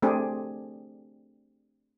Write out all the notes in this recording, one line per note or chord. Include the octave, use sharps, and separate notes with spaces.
A3 C4 D4 G4 G#4